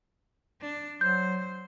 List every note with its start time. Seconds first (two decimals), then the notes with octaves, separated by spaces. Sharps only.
0.62 D4
1.01 F#3 C5 G6